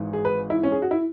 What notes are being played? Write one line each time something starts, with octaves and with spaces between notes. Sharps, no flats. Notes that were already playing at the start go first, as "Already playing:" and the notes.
Already playing: G#1 G#2 E3
G#4
B4
E4
C#4
G#4
F#4
E4